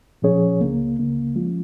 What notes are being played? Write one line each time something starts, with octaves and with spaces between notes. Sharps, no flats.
A#2 F3 C#4 G#4 C#5
C#2 C#3 A#3
C#2 C#3 A#3
F3 G#3 C#4 F4